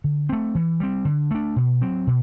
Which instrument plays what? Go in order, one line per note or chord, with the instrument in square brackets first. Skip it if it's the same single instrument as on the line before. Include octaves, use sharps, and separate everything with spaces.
[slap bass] D3
A3 C4
E3
G3 C4
D3
A3 D4
B2
F#3 C4
B2